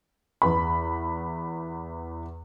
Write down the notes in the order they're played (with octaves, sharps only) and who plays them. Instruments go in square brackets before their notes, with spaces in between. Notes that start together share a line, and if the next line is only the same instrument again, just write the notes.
[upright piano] E2 B4 B5